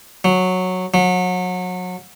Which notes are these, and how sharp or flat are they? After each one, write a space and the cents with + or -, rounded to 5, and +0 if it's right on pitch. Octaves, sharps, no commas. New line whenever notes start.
F#3 -10
F#3 -30